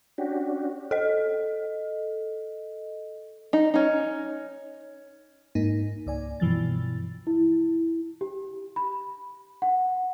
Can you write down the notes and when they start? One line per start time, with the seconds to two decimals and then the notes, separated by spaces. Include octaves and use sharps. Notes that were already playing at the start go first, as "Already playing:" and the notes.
0.18 C#4 D4 F#4 G4
0.91 A4 D#5
3.53 D#4
3.74 C#4 D#4
5.55 G#2 A#3 D#4
6.07 C#2 D5 G#5
6.40 G2 B2 E3 F3 A6
7.27 E4
8.21 G4
8.76 B5
9.62 F#5